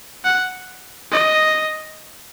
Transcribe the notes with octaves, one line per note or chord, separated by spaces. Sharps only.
F#5
D#5